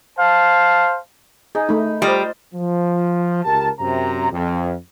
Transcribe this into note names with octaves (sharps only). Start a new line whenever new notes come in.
C5 F5 A5
D#4 G#4
A3 D#4 B5
G3 F4 C5 D#5
F3
C#2 G4 A#4 A5
F#2 C3 A#5
F2